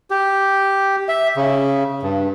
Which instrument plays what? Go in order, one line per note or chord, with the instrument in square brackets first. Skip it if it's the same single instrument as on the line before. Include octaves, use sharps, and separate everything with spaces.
[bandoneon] G4
E5
C#3
G2